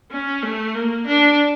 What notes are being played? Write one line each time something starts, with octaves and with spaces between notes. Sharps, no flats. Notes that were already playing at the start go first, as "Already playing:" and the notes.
C#4
A3
A#3
D4